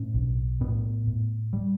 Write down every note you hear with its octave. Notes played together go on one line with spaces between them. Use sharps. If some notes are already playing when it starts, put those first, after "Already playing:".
Already playing: A2 C#4
B1
A2 B3
A2
G3